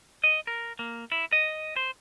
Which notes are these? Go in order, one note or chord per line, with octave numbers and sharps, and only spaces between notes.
D#5
A#4
A#3
E4
D#5
C5